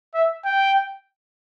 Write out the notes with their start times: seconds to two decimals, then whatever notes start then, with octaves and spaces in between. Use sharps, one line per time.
0.14 E5
0.45 G5